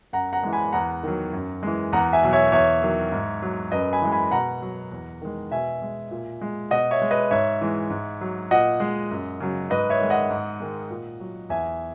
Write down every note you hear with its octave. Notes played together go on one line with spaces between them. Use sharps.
F#2 F#5 A#5
F#5 A#5
E3 G#3
G#5 B5
E2 F#5 A#5
D#3 F#3
F#2
E3 G#3
E2 F#5 A#5
E5 G#5
B2 F#3
C#5 E5
E2 C#5 E5
D#3 F#3
G#2
F#3
F#2 B4 D#5
G#5 B5
E3 G#3
G#5 B5
B2 F#5 A#5
F#3
E2
D#3 G#3
B2 E5 G#5
G#3
A#2
G#3
B2 D#5 F#5
C#5 E5
G#3
B4 D#5
G#2 C#5 E5
E3 G#3
G#2
F#3
A#2 D#5 F#5
G#3
F#2
C#3 F#3
G#2 B4 D#5
C#5 E5
D#3 G#3
D#5 F#5
G#2
D#3 G#3
A#2
F#3
E2 E5 G#5